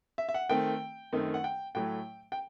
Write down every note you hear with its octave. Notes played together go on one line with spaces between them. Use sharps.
E5
E5
F#5
D#3 A3 C4 G5
F#2 D#3 A3 C4 D#4
F#5
G5
A2 F#3 A3 G5
G5